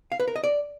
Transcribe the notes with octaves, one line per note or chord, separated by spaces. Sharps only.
F5
B4
A#4
D#5
D5